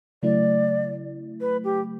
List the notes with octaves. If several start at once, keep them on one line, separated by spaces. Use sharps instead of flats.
C#3 F#3 A3 E4 D5
B4
G4